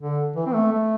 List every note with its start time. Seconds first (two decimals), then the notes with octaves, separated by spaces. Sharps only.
0.01 D3
0.36 E3
0.46 C4
0.54 A3
0.72 A3